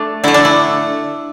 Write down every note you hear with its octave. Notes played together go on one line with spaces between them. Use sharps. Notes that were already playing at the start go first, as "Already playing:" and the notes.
Already playing: A3 D4
D3 A3 E4
D4
E4